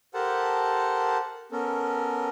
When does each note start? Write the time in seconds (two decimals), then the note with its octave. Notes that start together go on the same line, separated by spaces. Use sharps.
0.14 G4 A4 A#4 C5 F#5 A5
1.52 B3 C#4 A4 A#4